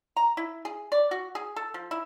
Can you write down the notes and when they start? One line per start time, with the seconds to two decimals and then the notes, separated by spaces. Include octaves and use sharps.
0.17 A#5
0.37 E4
0.65 G#4
0.92 D5
1.11 F#4
1.35 G#4
1.56 A4
1.74 F3
1.91 E4